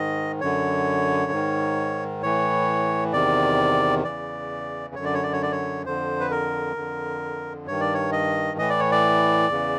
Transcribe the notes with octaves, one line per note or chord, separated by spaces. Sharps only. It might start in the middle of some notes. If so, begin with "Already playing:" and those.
Already playing: G#2 D#3 D#5
F#2 D3 C#5
G#2 D#3
A2 E3 C#5
E2 C3 D#3 D5
E2 C#3 E3 D5
F#2 D3 C#5
D5
C#5
D5
C#5
D5
C#5
F2 D3 C5
B4
A#4
F2 D3
G2 D#3 C#5
D5
C#5
D#5
A2 E3 D#5
D5
C#5
D5
E2 C#3 E3